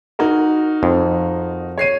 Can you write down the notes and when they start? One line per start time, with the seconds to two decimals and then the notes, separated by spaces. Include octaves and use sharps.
0.19 D#4 F#4 A#4
0.83 F2
1.78 C#5 C7 D#7